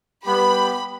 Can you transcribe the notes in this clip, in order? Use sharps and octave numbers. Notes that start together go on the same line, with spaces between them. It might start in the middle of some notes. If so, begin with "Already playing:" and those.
G3 B3 G4 B5